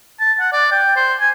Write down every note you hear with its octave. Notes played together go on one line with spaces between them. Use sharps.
A5
F#5
D5
G5
C5
G#5